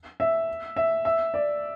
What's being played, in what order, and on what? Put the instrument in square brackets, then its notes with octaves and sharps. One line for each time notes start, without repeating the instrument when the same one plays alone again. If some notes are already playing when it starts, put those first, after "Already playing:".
[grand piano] E5
E5
E5
D5